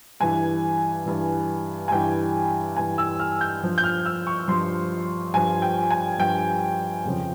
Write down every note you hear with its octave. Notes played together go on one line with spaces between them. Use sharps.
G2 E3 G#5
G2 E3
G#5
G2 E3 G5
G2 E3 G#5
E6
F6
G6
G2 F3
G6
F6
E6
C#6
G2 F3 C6
G2 F3 G#5
G5
G#5
G2 F3 G5
F2 C#3 F3